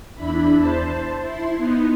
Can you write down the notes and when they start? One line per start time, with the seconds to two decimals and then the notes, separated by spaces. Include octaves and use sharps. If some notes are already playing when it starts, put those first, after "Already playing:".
0.15 E2 D4 E4 B5
0.57 C5 A5
1.20 E4 C6
1.57 B3 D#4